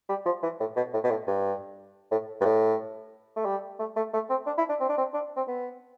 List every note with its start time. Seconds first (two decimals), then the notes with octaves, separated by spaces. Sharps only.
0.09 G3
0.26 F3
0.43 E3
0.60 A2
0.76 B2
0.93 A2
1.04 B2
1.11 A2
1.27 G2
2.11 A2
2.41 G2
2.45 A2
3.36 A3
3.45 G3
3.79 A3
3.96 A3
4.13 A3
4.30 C4
4.46 D4
4.58 E4
4.69 D4
4.80 C4
4.89 D4
4.98 C4
5.14 D4
5.36 C4
5.48 B3